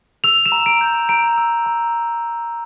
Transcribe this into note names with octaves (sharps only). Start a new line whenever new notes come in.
E6 F7
E7
A#5
D7
G6
A#5 D7
E6
A#5